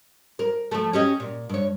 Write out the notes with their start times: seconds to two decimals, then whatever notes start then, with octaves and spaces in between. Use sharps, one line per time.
0.39 A#4
0.71 F3 A3
0.93 C#4 G4 D#5
1.20 A#2
1.49 G2 C#5